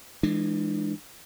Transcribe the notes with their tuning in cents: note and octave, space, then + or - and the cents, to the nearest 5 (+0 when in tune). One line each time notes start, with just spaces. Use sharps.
E3 +0 G#3 +0 D4 +35